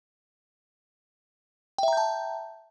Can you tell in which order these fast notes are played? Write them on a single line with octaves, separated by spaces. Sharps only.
G5 E5 A#5 G6 A5